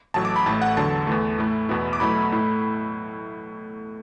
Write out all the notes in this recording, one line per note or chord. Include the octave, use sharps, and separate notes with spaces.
A1 A2 F#3 A5
D6
B5
A1 A2 A3 A5
F#5
E2 D3 F#3 A5
E2 E3 A3
A2 A3 E4
E2 B2 B3 E4
D6
B2 F#3 A3 E4 B5
A2 A3 E4